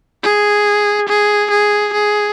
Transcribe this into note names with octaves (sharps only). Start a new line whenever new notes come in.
G#4
G#4
G#4
G#4